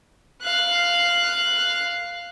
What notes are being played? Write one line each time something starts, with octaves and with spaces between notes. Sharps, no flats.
F5 F#6